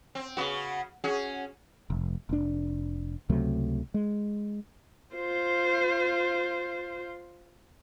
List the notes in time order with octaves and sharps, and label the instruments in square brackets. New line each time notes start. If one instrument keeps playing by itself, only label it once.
[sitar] C4
C#3 B3 F#4
C#4 F#4 G#4
[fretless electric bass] F1
F1 D4
C#2 C3 F#3 A3
G#3
[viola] F4 C5